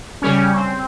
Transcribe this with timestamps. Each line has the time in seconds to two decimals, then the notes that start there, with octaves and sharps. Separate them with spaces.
0.22 C#3 G3 C#4
0.56 C4